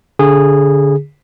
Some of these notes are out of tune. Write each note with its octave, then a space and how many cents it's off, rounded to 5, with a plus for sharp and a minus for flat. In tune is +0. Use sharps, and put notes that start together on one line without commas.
D3 -25 G#4 -20